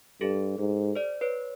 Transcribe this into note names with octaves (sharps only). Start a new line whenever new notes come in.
G2 G4 A4
G#2
C5 D5
B4 C#5